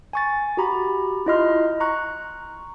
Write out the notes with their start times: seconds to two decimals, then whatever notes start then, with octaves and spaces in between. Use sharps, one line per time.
0.13 G#5 C#6 A6
0.57 F#4 G4 A#5 B5
1.26 E4 F4 D#5 C6 F6
1.80 A#5 C#6 F#6